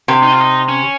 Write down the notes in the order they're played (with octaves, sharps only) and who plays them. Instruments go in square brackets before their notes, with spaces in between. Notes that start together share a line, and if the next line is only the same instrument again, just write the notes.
[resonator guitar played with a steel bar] C3
[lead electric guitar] D#4
F4
D#4
C#4